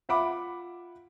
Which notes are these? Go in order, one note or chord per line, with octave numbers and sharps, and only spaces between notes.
F4 E5 F#5 B5 D6